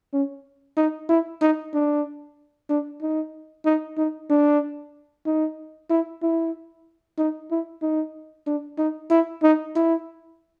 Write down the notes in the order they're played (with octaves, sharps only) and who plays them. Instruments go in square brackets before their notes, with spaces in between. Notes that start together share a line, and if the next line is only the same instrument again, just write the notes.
[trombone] C#4
D#4
E4
D#4
D4
D4
D#4
D#4
D#4
D4
D#4
E4
E4
D#4
E4
D#4
D4
D#4
E4
D#4
E4